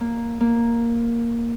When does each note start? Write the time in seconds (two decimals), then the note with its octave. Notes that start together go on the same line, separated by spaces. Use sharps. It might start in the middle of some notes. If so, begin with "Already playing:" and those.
0.01 A#3
0.40 A#3